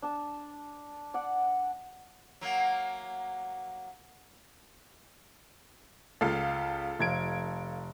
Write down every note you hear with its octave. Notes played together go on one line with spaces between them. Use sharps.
D4 A5
D5 F#5
F#3 A#3
C#2 A4 F5
F1 G#6 D7